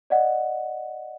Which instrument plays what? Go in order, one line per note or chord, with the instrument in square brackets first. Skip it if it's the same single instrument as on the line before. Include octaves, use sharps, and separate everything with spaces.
[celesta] D5 D#5 F#5